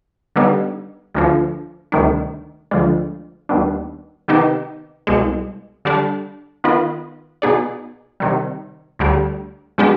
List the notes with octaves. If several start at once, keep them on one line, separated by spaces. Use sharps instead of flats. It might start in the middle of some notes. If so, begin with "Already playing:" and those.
D3 G3 B3 D#4
D2 D3 F3
D2 C3 D#3 G3 D4
D2 D3 F3 G#3 D4
D#2 D#3 G3 B3 D4
C3 D#3 B3 D#4 G4
C2 B2 G#3
D3 G3 D4
D#3 B3 F4 B4 D#5
B2 B3 D#4 G#4 D5
C3 D#3 G3
D2 D3 G3
B2 G#3 D4 G4